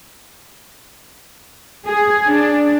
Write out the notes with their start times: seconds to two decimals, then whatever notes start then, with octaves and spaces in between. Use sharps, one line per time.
1.86 G#4
2.27 D4